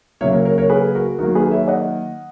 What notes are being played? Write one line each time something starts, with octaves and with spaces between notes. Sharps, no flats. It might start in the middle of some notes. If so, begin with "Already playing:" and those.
C#3 F#3 A#3 C#5 E5
A#4 C#5
A#4 C#5
A#4 C#5
G#4 B4
F#4 A#4
D#3 F#3 A#3 F#4 A#4
G#4 B4
C#5 E5
D#5 F#5